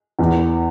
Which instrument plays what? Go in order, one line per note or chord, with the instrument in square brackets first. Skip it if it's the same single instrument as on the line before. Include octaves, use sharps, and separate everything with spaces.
[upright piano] E2